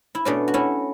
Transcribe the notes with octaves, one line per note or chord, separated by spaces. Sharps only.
E4
B2 A3 C#4 D4
F#4
C#4 E4